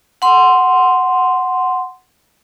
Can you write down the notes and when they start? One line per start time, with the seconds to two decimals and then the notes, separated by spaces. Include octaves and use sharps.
0.22 F#5 C6